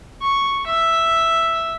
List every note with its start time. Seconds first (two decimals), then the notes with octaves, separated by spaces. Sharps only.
0.21 C#6
0.67 E5